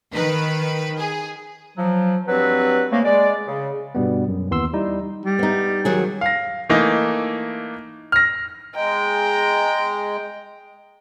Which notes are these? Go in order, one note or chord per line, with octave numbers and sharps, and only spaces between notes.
D#3 B4
G#4
F3 F#3
G2 F#3 C4 B4
G#2 C#3 A3 A#3
G#3 D5
C#3
G2 B2 G3 B3
F#2
D#2 E3 B3 C6 E6
G3 D#4 E4
G3
B3 D#4
D#3 F#3 G#4
F5 A#6
E3 A3 A#3 D#4
F6 A#6
G#3 G5 A#5